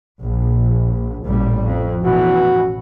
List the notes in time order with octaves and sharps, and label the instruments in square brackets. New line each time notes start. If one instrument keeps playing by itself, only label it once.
[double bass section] A#1
A1 A#2 G3
F2
[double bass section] A1 B2 E3 [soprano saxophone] F#4